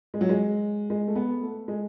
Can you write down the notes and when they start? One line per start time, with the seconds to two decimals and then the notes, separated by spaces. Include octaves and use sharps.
0.14 G#3
0.21 F#3
0.29 G#3
0.90 G#3
1.08 A3
1.15 B3
1.42 A3
1.68 G#3